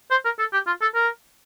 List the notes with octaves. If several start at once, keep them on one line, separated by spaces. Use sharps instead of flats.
C5
A#4
A4
G4
F4
A4
A#4